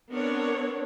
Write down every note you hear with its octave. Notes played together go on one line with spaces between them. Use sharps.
B3 C4 D4 A#4 C#5